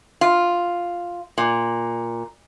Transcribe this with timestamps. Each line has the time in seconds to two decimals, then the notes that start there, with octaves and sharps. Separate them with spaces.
0.21 F4
1.38 A#2